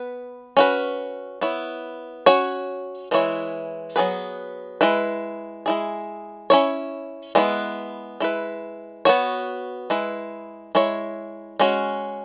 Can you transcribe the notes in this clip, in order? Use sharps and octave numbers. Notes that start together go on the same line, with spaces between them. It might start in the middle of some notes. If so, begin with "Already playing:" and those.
Already playing: B3 B4
C#4 F#4 B4
B3 E4 C#5
C#4 F#4 C#5
E3 G#3 E4 C#5
F#3 B3 G#4 B4
G#3 E4 B4
G#3 E4 G#4
C#4 E4 C#5
G#3 B3 E4 B4
G#3 E4 B4
B3 F#4 C#5
G#3 E4 B4
G#3 E4 C#5
G#3 C#4 F#4